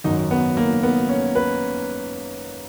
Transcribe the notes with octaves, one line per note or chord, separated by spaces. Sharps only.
G#1 F#2 D#3 F#3 D#4
B3
A#3
B3
C#4
B4